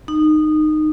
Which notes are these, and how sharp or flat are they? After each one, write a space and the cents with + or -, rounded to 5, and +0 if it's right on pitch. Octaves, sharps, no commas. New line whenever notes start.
D#4 -20